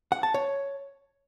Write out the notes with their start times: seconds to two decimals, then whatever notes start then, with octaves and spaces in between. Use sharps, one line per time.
0.12 F#5
0.23 A5
0.34 C#5